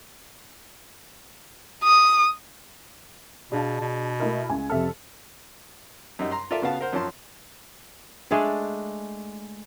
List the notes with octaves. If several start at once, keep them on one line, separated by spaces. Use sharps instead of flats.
D#6
B2 D4 G#4 F5 A5
B2
A3 E4 A#4 D#5
C#2 G#5
F2 C3 A4 E5 F6
F#2 G3 D#4
A#5 C6
F4 A4 A#4 D5 E5 F5
C#3 B3 F#4 F5 A5
A#4 C5 F#5
F#2 F3 C#4 A5 C6
G#3 A3 D4 G#4